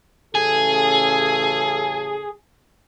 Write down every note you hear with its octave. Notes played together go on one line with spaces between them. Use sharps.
A1 C#3 G#4 A4